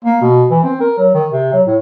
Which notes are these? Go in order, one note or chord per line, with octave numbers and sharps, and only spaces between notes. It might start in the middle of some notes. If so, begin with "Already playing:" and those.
A#3
B2
E3
C4
A#4
F#3
D#3
C3
F#3
A2